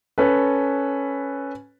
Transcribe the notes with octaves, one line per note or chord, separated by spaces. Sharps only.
C#4 A4 B4